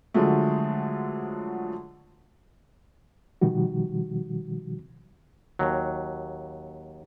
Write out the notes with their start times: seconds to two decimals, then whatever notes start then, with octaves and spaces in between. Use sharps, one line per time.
0.14 D3 F3 F#3 G#3 A3
3.42 B2 D#3 F3 G3 F#4
5.59 D#2 F#3